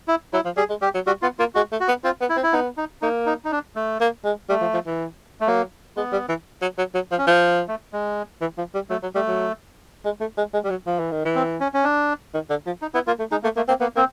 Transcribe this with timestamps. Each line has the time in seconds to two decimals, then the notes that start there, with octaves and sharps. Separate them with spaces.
0.08 E4
0.33 F#3 E4
0.45 F3
0.57 G3 G#4
0.70 G#3
0.81 G3 G4
0.94 F#3
1.07 G3 F#4
1.22 B3 F4
1.39 A#3 F4
1.55 G#3 F#4
1.72 A3
1.80 F#4
1.88 B3
2.04 C4 F4
2.21 B3
2.29 E4
2.37 C4
2.43 E4
2.53 B3 D#4
2.77 D#4
3.02 A#3 D#4
3.26 D#4
3.45 D#4
3.52 D4
3.76 A3
4.01 A#3
4.25 G#3
4.49 G3 A3
4.61 F3
4.74 F3
4.86 E3
5.41 A3
5.47 F#3 A#3
5.97 G#3 B3
6.12 G3
6.29 E3
6.62 F#3
6.78 F#3
6.95 F#3
7.11 F3
7.18 C#4
7.27 F3
7.68 A3
7.93 G#3
8.41 E3
8.58 F3
8.74 G3
8.90 F#3 A3
9.03 F#3
9.15 G3 A3
9.28 F#3
10.05 G#3
10.21 A3
10.38 G#3
10.54 G#3
10.64 G3
10.70 F#3
10.86 F3
10.99 E3
11.12 D#3
11.25 E3
11.35 C4
11.61 C#4
11.74 C#4
11.84 D4
12.34 D#3
12.50 D3
12.66 F3
12.82 D#4
12.94 B3 E4
13.07 A#3 F4
13.19 A3
13.32 G#3 D#4
13.43 A3 A#3
13.56 A3 A#3
13.68 A#3 C4
13.80 A#3 B3
13.96 A#3 C4